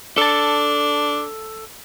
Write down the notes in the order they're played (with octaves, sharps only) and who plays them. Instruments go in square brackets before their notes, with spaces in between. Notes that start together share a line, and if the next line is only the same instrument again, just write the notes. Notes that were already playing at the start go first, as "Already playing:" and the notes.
[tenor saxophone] D4 [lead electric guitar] A4 A5